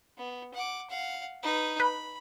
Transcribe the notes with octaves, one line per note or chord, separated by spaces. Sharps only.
B3
F#5 D6
F5 F#5
D#4 B4
B4 B5